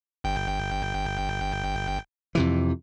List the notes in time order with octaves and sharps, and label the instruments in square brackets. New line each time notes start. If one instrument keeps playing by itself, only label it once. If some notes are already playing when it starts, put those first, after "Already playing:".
[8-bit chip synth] G1 G5
[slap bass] F2 C3 E3